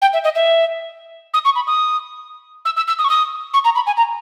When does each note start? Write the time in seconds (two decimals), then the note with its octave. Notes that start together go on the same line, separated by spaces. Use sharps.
0.02 G5
0.13 E5
0.24 D#5
0.35 E5
1.34 D#6
1.45 C#6
1.56 B5
1.67 D#6
2.65 E6
2.77 E6
2.88 E6
2.99 D#6
3.05 C#6
3.10 D#6
3.54 C#6
3.65 A#5
3.76 B5
3.87 G#5
3.97 A#5